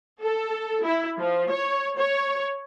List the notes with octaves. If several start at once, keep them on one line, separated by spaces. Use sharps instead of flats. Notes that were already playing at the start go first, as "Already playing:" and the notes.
A4
E4
F3
C#5
C#5